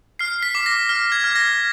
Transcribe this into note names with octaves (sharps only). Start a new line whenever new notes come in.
F6 C7
B6
D6
A#6
F6
G#6
F6
A#6